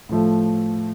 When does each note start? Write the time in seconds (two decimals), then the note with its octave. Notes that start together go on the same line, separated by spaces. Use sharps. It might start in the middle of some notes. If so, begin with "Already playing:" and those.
0.09 A2 F3 A3